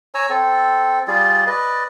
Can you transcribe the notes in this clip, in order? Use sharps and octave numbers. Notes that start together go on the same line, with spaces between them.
C#5 G#5 A#5 E6
C4 A4
G3 F4 G#4 D5
B4 D5 D#5